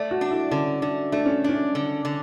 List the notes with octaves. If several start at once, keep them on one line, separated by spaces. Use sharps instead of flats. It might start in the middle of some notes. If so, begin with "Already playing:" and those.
Already playing: A3 D5
F#4
D4
E4
D3 C#4
D3 D4
A3 D4
C#4
C#4 D4
D3
D3